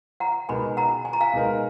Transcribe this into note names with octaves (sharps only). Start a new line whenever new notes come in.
F#5 A#5
B2 G#3 D#4 A#4 G#5 B5
F#5 A#5
G#5
A#5
F5 G#5
B2 G#3 D#4 A#4